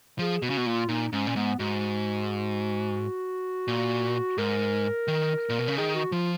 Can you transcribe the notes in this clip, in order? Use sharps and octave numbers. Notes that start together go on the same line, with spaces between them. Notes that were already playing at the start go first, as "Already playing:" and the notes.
F3 G#4
B2 F#4
C#3
B2
A#2 F4
A#2 D#4
G#2 C#4
A#2
G#2 B3
G#2 F#4
A#2
G#2 A#4
D#3
A#2
B2
C#3
D#3 G#4
F#4
F3 F4